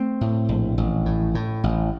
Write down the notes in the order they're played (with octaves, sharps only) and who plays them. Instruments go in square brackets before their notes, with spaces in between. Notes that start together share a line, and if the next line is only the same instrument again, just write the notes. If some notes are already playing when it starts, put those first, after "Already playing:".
Already playing: [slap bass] A3 C4
A2
A#1
A1
A2
A2
A1